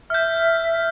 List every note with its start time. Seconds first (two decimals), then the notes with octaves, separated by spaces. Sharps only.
0.10 E5 F6 G6